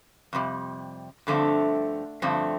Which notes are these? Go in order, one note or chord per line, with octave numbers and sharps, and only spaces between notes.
F2 C3 G3
G2 D3 F3 A3 C4 E5
G2 D3 F3 A3 C4